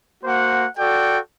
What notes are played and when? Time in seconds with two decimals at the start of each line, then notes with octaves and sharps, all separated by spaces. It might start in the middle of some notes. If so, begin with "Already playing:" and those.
0.24 A#3 F#4 C5 F#5
0.77 F#4 A4 D5 G5